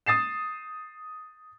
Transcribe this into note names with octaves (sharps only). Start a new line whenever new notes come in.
D#6 A6 C7 E7